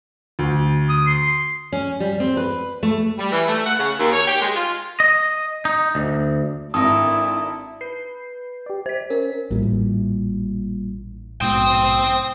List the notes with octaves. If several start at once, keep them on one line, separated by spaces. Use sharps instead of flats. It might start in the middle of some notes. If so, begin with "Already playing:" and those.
D2
D#6
C6
C#4
G3
C4
B4
A3
G3
E3
A3
F#5
C#3
D#2
C#5
G4
G#3
F4
D#5
D#4
D2
G#1 D4 E4 A4 A#4 D#6
B4 G6 C7
G4 D5
C5 B6
C#4 A#4
A1 A#2 G3
A#1 G#2 B2 C5 G5 D#6